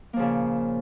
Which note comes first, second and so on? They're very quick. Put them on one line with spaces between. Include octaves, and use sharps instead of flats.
A#3 F3 C#3 A#2